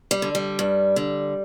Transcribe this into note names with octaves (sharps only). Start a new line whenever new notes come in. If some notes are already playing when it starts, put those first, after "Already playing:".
G3
D3
G3
G2
D3